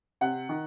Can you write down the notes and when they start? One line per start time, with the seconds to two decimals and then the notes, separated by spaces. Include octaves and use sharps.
0.21 C3 F#5
0.49 D#3